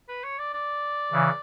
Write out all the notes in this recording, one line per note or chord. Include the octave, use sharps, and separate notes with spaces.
B4
C#5
D5
D5
C#3 E3